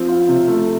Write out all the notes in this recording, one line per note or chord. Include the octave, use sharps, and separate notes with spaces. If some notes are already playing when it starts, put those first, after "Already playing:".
Already playing: F3 C4
F4
C3
A3